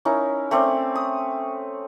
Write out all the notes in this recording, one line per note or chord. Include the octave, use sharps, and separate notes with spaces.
C#4 D#4 E4 A#4
A3 C4 C#4 D5
D#6